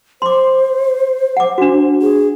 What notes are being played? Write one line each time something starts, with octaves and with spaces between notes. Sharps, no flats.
C5 C6 D6
F#5 D6
D4 F#4
G#4